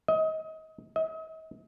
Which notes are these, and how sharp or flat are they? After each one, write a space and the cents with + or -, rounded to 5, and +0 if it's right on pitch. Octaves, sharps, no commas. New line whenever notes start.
D#5 +30
D#5 +45